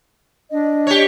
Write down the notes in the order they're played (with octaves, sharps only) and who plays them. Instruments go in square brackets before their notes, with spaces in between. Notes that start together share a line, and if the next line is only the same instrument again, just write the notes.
[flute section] D4 D#5
[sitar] G4 C#5